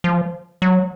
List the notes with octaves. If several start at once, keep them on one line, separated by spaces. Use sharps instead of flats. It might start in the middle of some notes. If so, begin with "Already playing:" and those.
F3
F#3